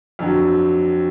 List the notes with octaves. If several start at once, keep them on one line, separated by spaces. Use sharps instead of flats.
F2 D3 F#3